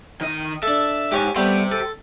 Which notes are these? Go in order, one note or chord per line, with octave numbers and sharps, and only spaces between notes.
D#3 D#5
D4 A4 E5
G#2 G4 C#5 G#5
G3 A3 B3 G4 C5
A4